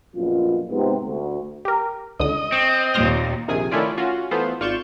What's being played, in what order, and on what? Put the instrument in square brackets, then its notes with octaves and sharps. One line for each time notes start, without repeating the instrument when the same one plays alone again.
[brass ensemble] A#1 F#2 B2 F4
G#2 C3 B3
D2
[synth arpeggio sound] G4 A#4
[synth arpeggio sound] C#2 D3 D#6 [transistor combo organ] D#5
[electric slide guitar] C4 [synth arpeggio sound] C#6
[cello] D#2 A#2 [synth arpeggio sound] C6 F6 A#6
[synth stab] A#1 C3 D#3 G#4 G#5 D#6
D#3 A3 C#4 E4 F4 D5
C#4 F4 F#4
E3 A3 B3 F4 C5
G#1 F4 D5 C#6 G6 E7